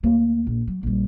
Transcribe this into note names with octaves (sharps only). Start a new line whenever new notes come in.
D2 A#3
A#1
F#3
A#1 G3